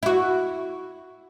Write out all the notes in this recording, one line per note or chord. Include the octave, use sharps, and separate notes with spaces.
E4 F#4